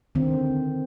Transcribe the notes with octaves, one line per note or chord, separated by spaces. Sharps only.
D3 D#3 C4